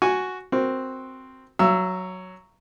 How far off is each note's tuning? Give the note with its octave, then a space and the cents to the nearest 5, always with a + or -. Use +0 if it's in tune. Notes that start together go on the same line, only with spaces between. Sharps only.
F#4 +0 G#5 +0
C4 +0 F#4 +0 A#4 +0
F#3 +0 F5 -45 E6 +10